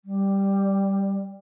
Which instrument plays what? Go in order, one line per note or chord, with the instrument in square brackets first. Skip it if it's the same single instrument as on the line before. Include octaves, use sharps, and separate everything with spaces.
[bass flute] G3